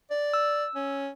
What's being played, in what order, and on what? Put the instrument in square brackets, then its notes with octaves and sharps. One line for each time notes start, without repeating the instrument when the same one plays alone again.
[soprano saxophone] D5
[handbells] E6
[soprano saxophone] C#4